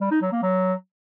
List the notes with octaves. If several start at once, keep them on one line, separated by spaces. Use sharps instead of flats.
G3
D#4
F#3
A#3
F#3